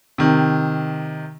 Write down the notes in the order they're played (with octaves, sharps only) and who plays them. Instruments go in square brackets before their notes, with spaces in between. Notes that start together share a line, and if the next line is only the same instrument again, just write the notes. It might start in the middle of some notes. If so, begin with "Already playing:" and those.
[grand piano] C3 D#3